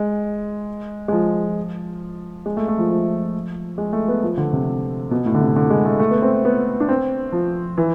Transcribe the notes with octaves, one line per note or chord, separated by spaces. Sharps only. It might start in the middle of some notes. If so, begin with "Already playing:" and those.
Already playing: G#3
G#3
F3
G#3
A3
A3
F3
F3
G#3
A3
B3
F3
D3
C3
B2
A2
D3
C3
D3
G#3
A3
A3
B3
C4
B3
D4
C4
F3
E3